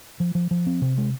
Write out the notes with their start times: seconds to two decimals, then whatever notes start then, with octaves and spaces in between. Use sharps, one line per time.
0.20 F3
0.35 F3
0.51 F3
0.67 C4
0.81 C3
0.98 G#3